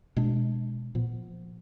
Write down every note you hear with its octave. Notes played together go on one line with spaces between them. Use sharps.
B2 G#3 D4
A#2 F3 B3